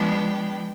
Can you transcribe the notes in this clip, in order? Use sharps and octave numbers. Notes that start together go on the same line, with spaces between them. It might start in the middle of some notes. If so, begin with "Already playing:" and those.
Already playing: F3 G#3 B3 D4 G5